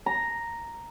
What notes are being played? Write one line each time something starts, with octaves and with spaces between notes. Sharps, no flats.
A#5